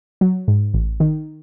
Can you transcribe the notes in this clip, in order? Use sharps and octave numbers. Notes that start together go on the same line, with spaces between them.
F#3
G#2
A1
D#3